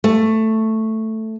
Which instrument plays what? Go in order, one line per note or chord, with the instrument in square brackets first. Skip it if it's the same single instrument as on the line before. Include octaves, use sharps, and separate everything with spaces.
[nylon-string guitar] A3